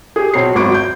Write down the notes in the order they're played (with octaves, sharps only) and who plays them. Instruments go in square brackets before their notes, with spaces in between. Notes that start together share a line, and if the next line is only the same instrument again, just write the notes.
[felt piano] G4 G#4
B1 C4 C#5 C7
G#1 F#2 C#6 D6 D7
G6